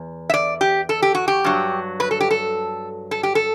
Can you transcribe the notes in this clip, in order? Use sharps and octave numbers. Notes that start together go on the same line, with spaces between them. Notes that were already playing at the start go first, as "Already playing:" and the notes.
Already playing: E2
E5
D5
G4
A4
G4
F#4
G4
G2 F#3
B4
A4
G4
A4
A4
G4
A4